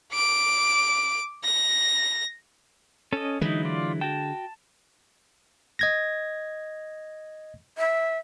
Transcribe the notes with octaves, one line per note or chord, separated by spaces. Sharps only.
D6 D7
A#6
C#4 A4 D#5
D3 E3 F#3 G#3 D#4 E4
F4 D5
F#4 G5 A5
D#5 G#6 A#6
E5